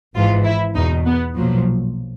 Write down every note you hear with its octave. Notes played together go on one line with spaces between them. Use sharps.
G#1 G#2 E3 F4
E4
E2 B2 D#4
B3
B1 A#2 F3 F#3